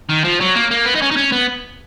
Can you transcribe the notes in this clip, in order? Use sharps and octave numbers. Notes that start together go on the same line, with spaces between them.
D#3
F3
F#3
A#3
A#3
B3
D#4
C#4
D#4
C#4
B3